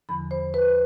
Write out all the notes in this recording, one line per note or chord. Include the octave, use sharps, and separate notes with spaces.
E2 D3 F3 B5
C5
B4